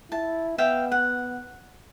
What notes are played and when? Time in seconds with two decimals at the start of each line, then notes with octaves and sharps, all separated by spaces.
0.12 E4 A5
0.58 B3 E5 F5 G5
0.92 F#5